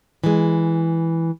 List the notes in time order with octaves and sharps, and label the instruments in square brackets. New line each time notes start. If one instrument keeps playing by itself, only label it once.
[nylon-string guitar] E3 G#3